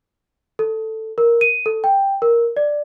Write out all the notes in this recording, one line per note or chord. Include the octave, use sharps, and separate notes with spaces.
A4
A#4
D#7
A4
G5
A#4
D5